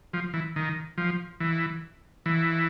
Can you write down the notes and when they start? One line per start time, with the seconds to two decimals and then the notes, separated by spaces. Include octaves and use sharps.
0.13 F3
0.34 E3
0.56 D#3
0.98 F3
1.40 E3
2.26 E3